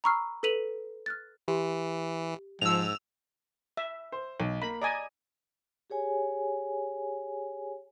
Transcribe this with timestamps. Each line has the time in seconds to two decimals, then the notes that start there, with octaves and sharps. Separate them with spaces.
0.04 A#5 B5 C#6 E6 F6 C7
0.43 A4 B4 B6 D#7 F7 F#7
1.06 F6 F#6 A6
1.48 E3 G4
2.61 G#2 F3 E6 F7
3.77 E5
4.12 C5
4.40 B1
4.62 A#3 B5
4.82 D5 D#5 G#5 A#5
5.90 G4 G#4 C#5 G#5